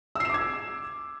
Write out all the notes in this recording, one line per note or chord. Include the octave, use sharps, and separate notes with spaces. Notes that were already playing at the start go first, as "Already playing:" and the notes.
D6 E6 G#6 C7 E7